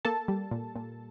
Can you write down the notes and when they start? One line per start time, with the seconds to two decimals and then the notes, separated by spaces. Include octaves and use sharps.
0.05 A#3 A4 A5
0.28 G3
0.51 A#2
0.76 A#2